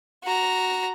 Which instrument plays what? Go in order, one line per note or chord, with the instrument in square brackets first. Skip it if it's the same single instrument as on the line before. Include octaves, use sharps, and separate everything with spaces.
[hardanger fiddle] F#4 A#5